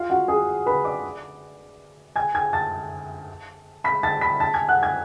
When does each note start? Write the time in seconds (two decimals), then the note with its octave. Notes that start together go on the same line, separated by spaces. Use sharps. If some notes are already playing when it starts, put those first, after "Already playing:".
Already playing: F4 F5
0.10 F#4 F#5
0.28 G#4 G#5
0.66 B4 B5
0.85 D5 D6
2.16 G#5 G#6
2.35 G#5 G#6
2.53 A5 A6
3.84 B5 B6
4.03 A5 A6
4.21 B5 B6
4.40 A5 A6
4.54 G#5 G#6
4.68 F#5 F#6
4.82 G#5 G#6